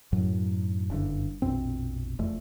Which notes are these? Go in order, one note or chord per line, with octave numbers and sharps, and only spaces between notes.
F#2 A2 F#3
F#1 G2 D3
A#1 F2 B2 C4
E1 F2 A3